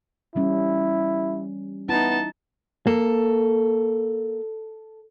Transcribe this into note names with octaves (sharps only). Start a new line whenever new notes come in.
E3 G3 C#4 E4
B3 D#4 E4 A5
A#3 A4